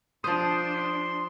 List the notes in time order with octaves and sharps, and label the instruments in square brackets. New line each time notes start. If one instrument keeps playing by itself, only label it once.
[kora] F3 C5 [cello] D4 [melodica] C6 [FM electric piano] D#6